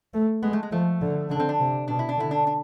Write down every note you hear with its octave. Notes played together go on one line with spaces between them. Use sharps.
A3
G#3 B3
A3
G#3
F3 A3
D3
D3 D4
C4
D4
C3
B2 D4
E4
D4
D3 E4
D4
D4